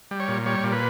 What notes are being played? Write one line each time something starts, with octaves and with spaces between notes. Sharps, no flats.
G3
C#5
A#2
G3 C#5
A#2
B4